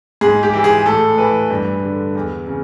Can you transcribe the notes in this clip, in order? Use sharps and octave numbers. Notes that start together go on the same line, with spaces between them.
G#2 G#4
G4
E3
G#4
A2 A4
E3 B4
G2
D3
E2
C#3